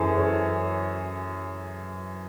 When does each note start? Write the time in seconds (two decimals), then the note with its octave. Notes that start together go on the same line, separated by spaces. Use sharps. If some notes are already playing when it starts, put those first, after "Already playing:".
Already playing: F#2 E3 G#4 A4 C5
0.16 A4 C#5